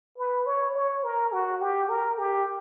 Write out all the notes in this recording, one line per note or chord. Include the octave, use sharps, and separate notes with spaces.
B4
C#5
C#5
A#4
F#4
G4
A#4
G4